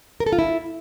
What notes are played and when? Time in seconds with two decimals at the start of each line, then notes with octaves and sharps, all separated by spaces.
0.20 A#4
0.26 A4
0.33 F4
0.39 E4